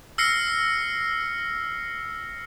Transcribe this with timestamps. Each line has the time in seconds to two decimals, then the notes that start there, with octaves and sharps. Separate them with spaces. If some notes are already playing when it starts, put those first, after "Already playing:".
0.18 E6 F6 A#6 C7 C#7